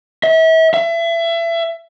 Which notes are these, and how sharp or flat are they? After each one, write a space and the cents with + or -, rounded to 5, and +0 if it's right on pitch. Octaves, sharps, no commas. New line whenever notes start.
E5 -35
E5 +30